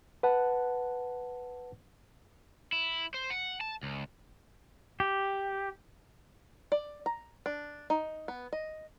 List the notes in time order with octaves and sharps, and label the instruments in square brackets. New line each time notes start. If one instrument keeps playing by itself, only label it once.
[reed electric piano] B4 F#5 A5
[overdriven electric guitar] E4
C5
F#5
A5
C#2
[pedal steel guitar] G4
[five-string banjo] D5
A#5
D4
D#4
B3
D#5